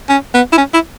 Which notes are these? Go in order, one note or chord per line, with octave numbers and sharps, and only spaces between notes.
C#4
B3
E4
C#4
E4